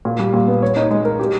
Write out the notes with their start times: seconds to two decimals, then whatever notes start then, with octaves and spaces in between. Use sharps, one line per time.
0.05 A#2
0.19 G3
0.34 A#2
0.48 B3
0.62 C#5
0.77 D#4
0.91 G#3
1.05 A#4
1.19 G4